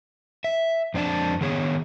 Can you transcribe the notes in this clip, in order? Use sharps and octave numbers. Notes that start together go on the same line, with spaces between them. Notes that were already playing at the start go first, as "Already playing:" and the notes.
E5
F2 C4 D4 E4 A5
D#3 B3 G#4 C#5